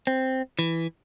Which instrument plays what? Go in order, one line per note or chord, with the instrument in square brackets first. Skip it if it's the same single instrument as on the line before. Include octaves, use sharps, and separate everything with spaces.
[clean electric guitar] C4
E3